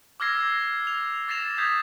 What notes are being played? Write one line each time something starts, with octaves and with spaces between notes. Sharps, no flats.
D6 E6 F6 G#6 A#6 C7
F7
D6 A6 A#6 C7 E7 F7
D#6 G6 G#6 B6